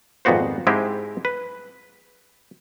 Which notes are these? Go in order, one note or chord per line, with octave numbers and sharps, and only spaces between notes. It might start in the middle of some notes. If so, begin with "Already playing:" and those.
G#1 F2 A#2 B3 F#4 C5
G#2 G#3 C4 E4 G4 G#4
B4